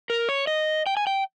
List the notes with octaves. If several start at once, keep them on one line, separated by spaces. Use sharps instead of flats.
A#4
C#5
D#5
G5
G#5
G5